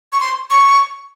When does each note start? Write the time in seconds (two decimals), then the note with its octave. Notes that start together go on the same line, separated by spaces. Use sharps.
0.13 C#6
0.20 C6
0.50 C#6